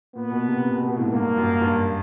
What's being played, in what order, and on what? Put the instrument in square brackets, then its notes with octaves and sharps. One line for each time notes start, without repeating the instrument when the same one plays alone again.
[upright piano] A#2 [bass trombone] B3
[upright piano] B2
C3
C3
B2
B2
A2
G#2
[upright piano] G2 [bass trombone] A#3
[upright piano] F#2
G2